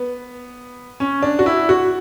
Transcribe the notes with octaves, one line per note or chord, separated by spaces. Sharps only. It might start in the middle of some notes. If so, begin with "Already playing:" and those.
Already playing: B3
C#4
D4
F#4
E4
F#4